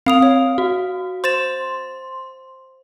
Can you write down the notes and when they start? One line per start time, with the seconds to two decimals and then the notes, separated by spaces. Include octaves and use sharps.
0.06 C4 F5 D#6 F7
0.22 C#5
0.58 F#4
1.24 C5 C6 A6 E7